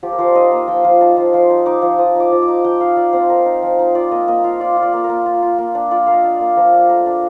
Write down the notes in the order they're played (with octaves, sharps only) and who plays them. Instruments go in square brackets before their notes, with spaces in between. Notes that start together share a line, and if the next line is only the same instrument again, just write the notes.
[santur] F3 G4
A#4
F3 C5
D5
D#4 D#5
A#3
F3 G5
F3
D#4 A5
F3
F3 C6
D#4
D#4 D6
F3
F3 D#6
D#4 D6
F3
D6
D#4
F3 G5
D#4 F5
F3 D5
C4 C5
D#4 A#4
D#4
F3
D#4
F4 D5
A#3 D#5
A#3 D#5
F4 F5
F4 D5
F4
D5
A#3
A#4
A#3
F4
F4
A#3
D4
F4 D5
A#3 F5
D#5
D4
D5
A#3
F3 A#4
D4
A3 A#4
D4